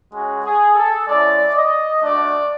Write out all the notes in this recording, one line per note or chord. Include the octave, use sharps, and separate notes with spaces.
G#3 C#4 F#4 G#4
G#4
A4
G#3 C#4 E4 D5
D#5
A3 D4 F#4 D5